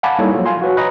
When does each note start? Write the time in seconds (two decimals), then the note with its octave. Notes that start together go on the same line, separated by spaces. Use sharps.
0.03 F5 F#5 G#5 A5 B5 D6
0.19 G3 A#3 D#4 E4 A4 C#5
0.34 F3 F#3 A#3 F4
0.46 F5 G#5 C6
0.62 F#4 B4 C#5
0.77 B4 D#5 G#5 A#5 B5